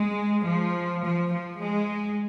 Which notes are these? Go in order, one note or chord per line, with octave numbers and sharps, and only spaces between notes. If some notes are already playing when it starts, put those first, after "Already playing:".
Already playing: G#3
F3
F3
F3
G#3